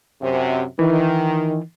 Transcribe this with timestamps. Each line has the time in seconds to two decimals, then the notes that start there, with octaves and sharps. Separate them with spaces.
0.22 F#2 C3
0.79 D#3 E3